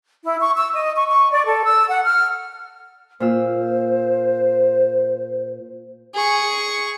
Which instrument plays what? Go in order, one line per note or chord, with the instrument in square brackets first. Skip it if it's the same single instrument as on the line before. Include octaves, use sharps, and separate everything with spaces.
[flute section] E4
C#6
E6
D#5
C#6
C#6
D5
A4
E6
F#5
F6
[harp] A#2 F4 E6 [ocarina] C5
[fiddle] G#4 C#6